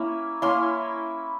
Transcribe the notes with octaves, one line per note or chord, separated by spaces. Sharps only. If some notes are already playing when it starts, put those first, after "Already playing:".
Already playing: A#3 C#4 E4
A#3 C#4 E4 C6